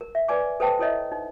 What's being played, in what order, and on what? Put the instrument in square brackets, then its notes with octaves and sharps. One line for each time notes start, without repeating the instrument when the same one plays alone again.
[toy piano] A#4
E5
B4 D5 G#5 D6
A4 B4 C5 G5 A5
E4 A4 C#5 D#5 E5
D#4